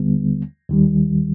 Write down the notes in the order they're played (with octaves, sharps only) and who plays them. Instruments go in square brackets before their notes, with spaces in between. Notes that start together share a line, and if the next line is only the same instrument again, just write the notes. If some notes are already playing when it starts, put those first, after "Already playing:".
Already playing: [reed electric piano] D#2 D3 G3 B3
D#2 D#3 G3